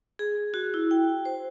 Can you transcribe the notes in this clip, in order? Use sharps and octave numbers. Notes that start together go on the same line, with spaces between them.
G#4
F#4
E4
G5
C5